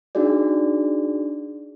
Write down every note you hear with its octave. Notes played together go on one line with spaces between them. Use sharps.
D4 D#4 F#4 G#4 D5